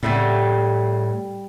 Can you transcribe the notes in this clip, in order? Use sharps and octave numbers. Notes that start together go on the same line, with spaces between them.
A2 C#3 G3 A3 C4 F#5